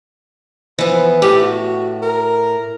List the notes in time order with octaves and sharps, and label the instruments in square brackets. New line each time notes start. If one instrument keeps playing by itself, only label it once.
[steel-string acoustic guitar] E3 B3 [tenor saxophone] F3
[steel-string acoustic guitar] A2 [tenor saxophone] G4
[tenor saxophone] F#4
A#4